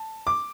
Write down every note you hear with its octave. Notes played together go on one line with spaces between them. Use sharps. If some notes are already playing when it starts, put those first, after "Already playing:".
Already playing: A5
D6